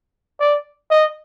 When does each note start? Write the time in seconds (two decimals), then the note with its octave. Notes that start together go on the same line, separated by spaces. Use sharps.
0.40 D5
0.91 D#5